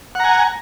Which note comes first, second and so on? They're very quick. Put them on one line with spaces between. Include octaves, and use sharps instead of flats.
F#5 A#5 G#5